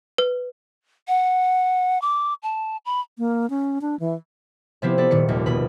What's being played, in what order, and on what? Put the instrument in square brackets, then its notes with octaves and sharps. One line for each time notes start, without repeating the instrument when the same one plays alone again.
[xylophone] B4
[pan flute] F#5
D6
A5
B5
[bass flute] A#3
C#4
D4
E3
[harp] C3 F3 B3 C4 E4 G4
B3 A4 D5 B5
D#1 A#2 D#3 C#7
F1 D#2
B2 B3 B4 B5